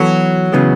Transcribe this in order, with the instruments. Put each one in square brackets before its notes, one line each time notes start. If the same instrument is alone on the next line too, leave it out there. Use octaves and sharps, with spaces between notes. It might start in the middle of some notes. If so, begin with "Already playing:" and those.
Already playing: [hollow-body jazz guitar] E3 B3 F#4 A4 [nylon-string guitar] F#3
[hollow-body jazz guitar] C#3 E3 G#3 B3